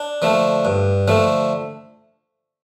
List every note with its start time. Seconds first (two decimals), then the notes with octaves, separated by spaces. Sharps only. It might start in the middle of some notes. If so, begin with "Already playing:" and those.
Already playing: D4
0.22 D3 F3 A3
0.65 G2
1.08 D3 F3 A3